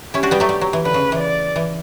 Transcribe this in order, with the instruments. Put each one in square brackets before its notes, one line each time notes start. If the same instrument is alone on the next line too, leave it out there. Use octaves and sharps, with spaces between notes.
[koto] C#4 E4 [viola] G4
[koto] D4 F#4
G3 B3
F#3 A3
G3
F#3
E3
[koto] D3 [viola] B4
[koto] C#3
E3
[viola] D5
[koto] E3